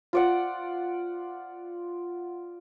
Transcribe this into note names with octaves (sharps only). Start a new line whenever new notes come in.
F4 D5 F#5